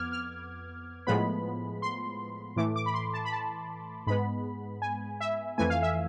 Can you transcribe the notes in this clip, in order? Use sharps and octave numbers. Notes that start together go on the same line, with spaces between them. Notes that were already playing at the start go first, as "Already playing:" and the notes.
Already playing: F2 B3 D6 F6 G#6
F6
A2 F3 G#3 B3 B5
C6
A2 E3 A3 D6
D6
B5
C6
A5
B5
A5
G#2 G#3 B3 B5
G#5
E5
F2 E3 A3 G#5
F5
E5